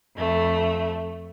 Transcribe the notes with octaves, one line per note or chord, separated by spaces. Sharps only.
F2 A3